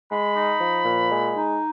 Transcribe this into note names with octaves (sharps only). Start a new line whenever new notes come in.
G#3 B5
D#4
F3
A#2
G#3
D#4